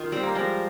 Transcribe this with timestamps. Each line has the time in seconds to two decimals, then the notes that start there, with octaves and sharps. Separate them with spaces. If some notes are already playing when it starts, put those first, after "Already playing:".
Already playing: D#3 F4
0.12 G3 C4
0.23 A#3
0.35 F3 G#3 A#4